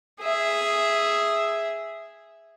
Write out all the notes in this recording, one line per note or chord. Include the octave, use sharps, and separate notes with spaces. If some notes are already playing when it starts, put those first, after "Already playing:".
G#4 E5